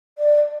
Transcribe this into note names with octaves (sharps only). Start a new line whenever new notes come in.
D5